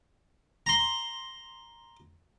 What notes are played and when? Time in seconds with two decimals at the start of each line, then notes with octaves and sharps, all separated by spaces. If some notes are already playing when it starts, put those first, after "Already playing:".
0.66 A#5 C6